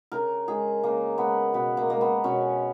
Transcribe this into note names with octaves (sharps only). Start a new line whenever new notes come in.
C#3 A#4
G#3 G#4
C#3 A#3
G#3 B3
B2 B3
A#3
G#3 A#3
B3
B2 C#4